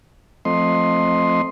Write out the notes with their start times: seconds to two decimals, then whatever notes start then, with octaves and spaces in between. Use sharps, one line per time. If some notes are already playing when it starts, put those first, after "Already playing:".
0.45 F3 A3 C4 D#5 C6